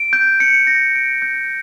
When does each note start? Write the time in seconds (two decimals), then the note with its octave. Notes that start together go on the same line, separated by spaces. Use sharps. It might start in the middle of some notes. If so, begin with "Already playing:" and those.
Already playing: D7
0.13 G6
0.40 C#7
0.67 A#6
0.96 D7
1.22 G6